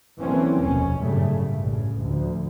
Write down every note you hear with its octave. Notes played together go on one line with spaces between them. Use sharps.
D3 E3 F#3 A#3 C4 C#4
F1 D#2 B2 C#4
G1 F#2 A2 C#3 G3 A3
A1 G2 C#3
D2 F3